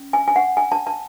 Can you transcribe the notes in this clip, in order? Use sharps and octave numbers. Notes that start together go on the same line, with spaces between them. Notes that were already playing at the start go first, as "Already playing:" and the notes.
Already playing: C#4
G#5
G#5
F#5
G#5
A5
A5